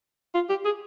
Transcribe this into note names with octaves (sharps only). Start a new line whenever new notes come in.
F4
G4
G#4